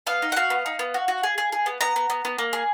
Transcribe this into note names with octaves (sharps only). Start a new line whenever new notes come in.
B3 F5
D#4
F#5
F#4 F5
B3
D#4
B3
F#4
F#4
G#4
G#4
G#4
B3
B3 A#5
B3
B3
B3
A#3
G#4